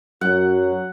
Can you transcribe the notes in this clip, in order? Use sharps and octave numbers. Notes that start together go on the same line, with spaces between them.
F#2 F#3 F#5